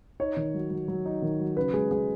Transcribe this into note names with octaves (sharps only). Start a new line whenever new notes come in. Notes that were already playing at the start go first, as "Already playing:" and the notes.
D#4 C#5
D#3
F#3
F#3
F#3
D#4
D#3
F#3
C#3 B4
G#3 G#4
G#3 G#4